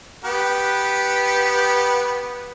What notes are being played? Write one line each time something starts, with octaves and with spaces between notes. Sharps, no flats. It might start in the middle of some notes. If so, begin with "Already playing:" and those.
B3 G4 B4